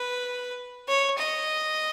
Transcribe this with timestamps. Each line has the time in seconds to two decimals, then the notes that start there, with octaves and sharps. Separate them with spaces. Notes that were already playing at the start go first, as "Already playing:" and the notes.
Already playing: B4
0.89 C#5
1.19 D#5